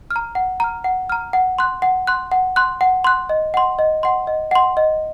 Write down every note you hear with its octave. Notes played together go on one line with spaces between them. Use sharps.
F6
A#5
F#5
A#5 F6
F#5
A#5 F6
F#5
C6 F#6
F#5
C6 F#6
F#5
C6 F#6
F#5
C6 F#6
D#5
F#5 C6
D#5
F#5 C6
D#5
F#5 C6
D#5